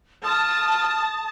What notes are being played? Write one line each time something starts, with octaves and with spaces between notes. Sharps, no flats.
F4 A5 D#6